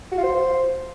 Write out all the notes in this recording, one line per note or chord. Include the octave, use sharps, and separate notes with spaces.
F#4
F4
C5